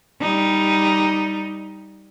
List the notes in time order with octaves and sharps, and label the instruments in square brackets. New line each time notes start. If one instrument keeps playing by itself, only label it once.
[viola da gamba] G3 D#4